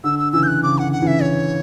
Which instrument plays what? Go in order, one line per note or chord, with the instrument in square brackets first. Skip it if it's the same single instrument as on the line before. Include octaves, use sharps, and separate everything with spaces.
[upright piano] D3 [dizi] E6
[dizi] E6
[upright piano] C#3 E3 [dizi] E6
[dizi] G6
F#6
[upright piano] C#3 [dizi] D6
[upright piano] D3 [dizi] F#5
[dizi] F#5
[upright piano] C#3 E3
[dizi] E5
C#5